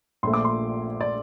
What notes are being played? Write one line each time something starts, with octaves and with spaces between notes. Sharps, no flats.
A#1 A#2 A3 C6
D6
C6
D5